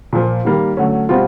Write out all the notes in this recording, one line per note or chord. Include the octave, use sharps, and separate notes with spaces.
A#2 F3 A#3
D#3 G3 A#3
D3 F#3 A3 C#4
B2 G3 C4 F4